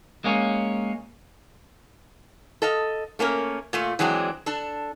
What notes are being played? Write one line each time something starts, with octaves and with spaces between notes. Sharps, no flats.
G#3 A#3 C#4
A4 D#5 F5
A3 A#3 C#4 A#4
A#2 A3 F4
E3 F#3 G#3 C4 D4
D4 A4